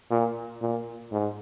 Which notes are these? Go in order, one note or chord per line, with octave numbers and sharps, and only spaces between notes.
A#2
A#2
G#2